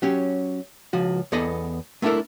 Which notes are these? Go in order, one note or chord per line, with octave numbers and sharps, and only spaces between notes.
F#3 C#4 G4
C#2 F3 F#4
E2 B3 A4 D#5 B5
A3 B3 D4 E4 A4 A#4